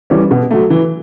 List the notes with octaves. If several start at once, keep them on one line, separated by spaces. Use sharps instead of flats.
E3 G3 C#4
B2
F#3 A3
E3